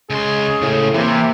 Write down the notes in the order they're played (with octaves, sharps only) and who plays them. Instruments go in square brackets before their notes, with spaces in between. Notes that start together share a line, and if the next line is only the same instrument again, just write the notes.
[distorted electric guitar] C#2 C6 [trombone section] G#3 C#4 G#4
[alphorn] A2 [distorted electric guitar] C#3
[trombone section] C3 E4 [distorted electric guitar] E3 [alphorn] A#3